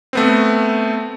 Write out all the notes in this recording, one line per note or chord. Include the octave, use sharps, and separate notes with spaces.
A3 B3 C4